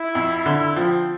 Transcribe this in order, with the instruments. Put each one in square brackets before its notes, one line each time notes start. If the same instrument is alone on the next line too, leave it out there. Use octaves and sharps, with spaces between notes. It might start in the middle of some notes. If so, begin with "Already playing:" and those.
Already playing: [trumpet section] E4
[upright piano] F2
[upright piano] D3 [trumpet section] E4
[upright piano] F3 [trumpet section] C4